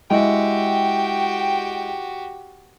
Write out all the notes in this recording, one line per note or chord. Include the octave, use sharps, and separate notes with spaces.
G#3 E4 F#4 G4 G5